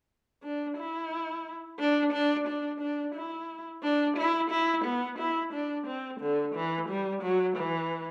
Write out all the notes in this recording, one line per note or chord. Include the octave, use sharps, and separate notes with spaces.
D4
E4
D4
D4
D4
D4
E4
D4
E4
E4
B3
E4
D4
C4
D3
E3
G3
F#3
E3